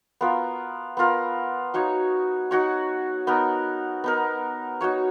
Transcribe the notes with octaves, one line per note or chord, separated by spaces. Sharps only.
B3 F4 A#4
B3 F4 A#4
D#4 F#4 C#5
D#4 F#4 C#5
B3 D#4 A#4
B3 D#4 A#4
D#4 F#4 C#5